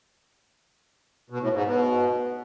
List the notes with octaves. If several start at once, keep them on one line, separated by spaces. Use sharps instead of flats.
B2
A2
G#2
B2